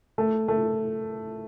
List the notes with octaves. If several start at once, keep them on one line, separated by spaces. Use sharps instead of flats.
A3
A3